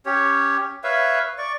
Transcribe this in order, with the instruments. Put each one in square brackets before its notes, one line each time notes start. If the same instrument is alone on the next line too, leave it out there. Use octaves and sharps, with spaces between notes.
[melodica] C#4 G4 C#5
B4 C#5 E5 F5
D5 C#6